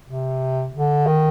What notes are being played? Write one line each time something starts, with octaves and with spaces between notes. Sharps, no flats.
C3
D3
D#3